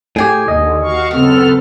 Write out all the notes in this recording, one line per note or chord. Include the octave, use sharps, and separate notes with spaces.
A2 G4 G#4 G#5
D#2 D3 D#5
F#4 F5 C#6
F#2 C#3 B3 C4 F#4 A4 F6